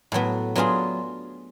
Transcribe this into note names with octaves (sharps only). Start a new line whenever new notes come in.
A2 F#3 B3
F#3 B3 D4 F4 G#4